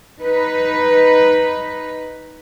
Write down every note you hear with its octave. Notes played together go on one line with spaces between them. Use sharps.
D#4 B4